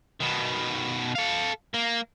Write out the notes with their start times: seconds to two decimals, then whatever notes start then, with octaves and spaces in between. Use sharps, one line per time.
0.20 B2 D#3
1.15 A4 F5
1.74 A#3